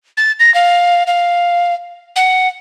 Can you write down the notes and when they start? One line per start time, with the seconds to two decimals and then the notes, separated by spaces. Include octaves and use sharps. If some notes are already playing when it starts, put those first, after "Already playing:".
0.17 A6
0.40 A#6
0.54 F5
1.07 F5
2.16 F#5